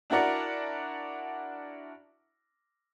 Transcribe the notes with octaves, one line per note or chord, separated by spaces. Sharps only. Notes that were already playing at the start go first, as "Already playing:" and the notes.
D4 E4 F#4 A#4 D5 F#5